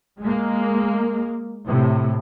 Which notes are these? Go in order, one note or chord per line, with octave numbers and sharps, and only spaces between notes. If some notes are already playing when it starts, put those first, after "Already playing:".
G#3 A#3
A2 C3